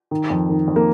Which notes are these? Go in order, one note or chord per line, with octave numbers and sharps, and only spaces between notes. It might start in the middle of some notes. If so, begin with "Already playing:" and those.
D#3
F2
D#3
F2
A#3